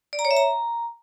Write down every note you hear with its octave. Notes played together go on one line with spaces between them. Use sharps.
D5
A#5
C#5
E5
A#5